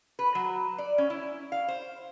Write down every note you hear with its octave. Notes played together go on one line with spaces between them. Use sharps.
B4
F#3
D5
C#4
E4
F5
C5